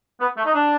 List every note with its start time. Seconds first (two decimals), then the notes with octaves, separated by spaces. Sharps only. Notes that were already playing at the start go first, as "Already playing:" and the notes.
0.20 B3
0.37 A3
0.46 D#4
0.54 D4